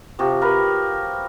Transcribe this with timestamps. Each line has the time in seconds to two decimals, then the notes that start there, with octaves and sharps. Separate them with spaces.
0.19 C3 F3 F#4 G4
0.42 A#4 B4